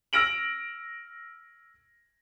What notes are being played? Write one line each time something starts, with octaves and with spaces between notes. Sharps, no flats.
E6 F6 A#6 D7 F#7